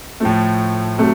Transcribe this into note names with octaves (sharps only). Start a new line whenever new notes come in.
A2 F3 A3
C3 F#3 A3